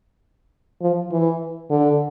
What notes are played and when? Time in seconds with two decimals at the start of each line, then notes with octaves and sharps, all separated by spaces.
0.81 F3
1.11 E3
1.70 D3